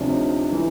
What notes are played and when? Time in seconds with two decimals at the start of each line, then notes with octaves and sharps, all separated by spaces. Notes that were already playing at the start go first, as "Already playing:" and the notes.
Already playing: D2 C3 F3 C#4 D4
0.09 D#4
0.52 E3